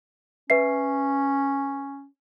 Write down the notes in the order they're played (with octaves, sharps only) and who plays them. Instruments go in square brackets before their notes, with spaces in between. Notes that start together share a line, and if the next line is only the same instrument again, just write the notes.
[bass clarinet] C#4 [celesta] B4 E5 C7